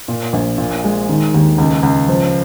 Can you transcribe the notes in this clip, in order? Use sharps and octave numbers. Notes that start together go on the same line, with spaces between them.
A#2
A#1
A#2
G#3
D#3
D#2
C#2
C#2
F3